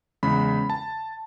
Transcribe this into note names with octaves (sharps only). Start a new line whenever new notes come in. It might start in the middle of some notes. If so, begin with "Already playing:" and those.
E2 C#3 G#3 B5
A5